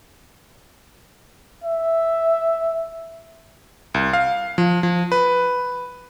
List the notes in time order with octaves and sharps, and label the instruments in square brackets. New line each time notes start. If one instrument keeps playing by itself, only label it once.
[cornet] E5
[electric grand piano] C2
F5
F3
F3
B4